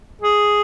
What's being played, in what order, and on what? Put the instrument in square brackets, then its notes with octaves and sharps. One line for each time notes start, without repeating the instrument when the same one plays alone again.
[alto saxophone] G#4